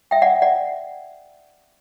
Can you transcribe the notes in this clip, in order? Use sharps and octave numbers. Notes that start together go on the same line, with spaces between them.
E5 G5
D5 F#5
D5 F#5